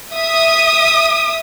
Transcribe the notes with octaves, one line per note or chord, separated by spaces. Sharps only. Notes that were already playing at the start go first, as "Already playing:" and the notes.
E5 D#6